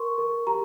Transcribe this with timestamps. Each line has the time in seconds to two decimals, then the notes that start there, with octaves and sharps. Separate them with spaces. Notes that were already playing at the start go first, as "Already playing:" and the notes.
Already playing: A#4 C6 C#6
0.18 A#4
0.47 G4 A#5